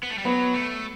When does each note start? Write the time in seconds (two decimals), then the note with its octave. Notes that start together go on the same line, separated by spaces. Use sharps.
0.03 B3
0.10 A3
0.18 G3
0.25 F#3 B3
0.54 A3